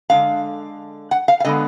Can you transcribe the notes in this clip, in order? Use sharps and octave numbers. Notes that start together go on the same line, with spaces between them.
D3 G#3 D4 F5
F#5
F5
F5
D3 G#3 B3 D#5